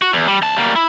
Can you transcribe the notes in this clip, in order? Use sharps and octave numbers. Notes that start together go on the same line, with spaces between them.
F#4
E2
G3
C#2 A5
G3 A#3
E4